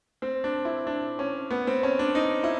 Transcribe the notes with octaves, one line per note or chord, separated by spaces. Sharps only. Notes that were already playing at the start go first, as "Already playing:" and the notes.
C4
D4
E4
D4
C#4
B3
C4
C#4
D4
D#4
E4